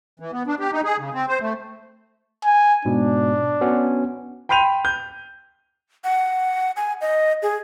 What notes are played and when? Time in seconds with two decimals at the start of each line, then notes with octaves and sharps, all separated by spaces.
0.20 E3
0.32 B3
0.47 D4
0.59 G4
0.72 D#4
0.84 G#4
0.99 C#3
1.14 C4
1.29 C5
1.40 A3
2.44 G#5
2.85 G#2 B2 D4
3.61 B3 C#4 F#4
4.49 G5 B5 C6 G6 D#7 F7
4.85 G6
6.04 F#5
6.77 G#5
7.01 D#5
7.42 G#4